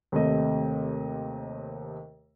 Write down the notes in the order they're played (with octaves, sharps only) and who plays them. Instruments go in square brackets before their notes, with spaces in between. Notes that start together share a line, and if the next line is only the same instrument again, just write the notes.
[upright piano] D#2 C3 A3 D#5